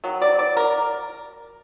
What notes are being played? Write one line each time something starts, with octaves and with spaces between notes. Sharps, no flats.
D#3 F#3
D5
D5
A#4